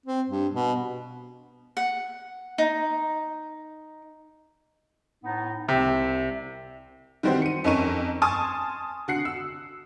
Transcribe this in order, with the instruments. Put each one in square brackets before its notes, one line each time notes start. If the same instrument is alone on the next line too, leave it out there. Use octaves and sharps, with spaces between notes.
[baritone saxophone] C4
G2
B2
[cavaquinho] F#5
D#4
[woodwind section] A2 B3 D#4
[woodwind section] C2 E5 [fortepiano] C3
[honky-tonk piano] D#3 E3 G3 C4 F#4 C5
C#7 D#7
F2 C#4 D#4 A#4 C#6 D#7
G#5 A5 C6 C#6 D#6 F6
D3 F#4 F#6 C7 C#7
E6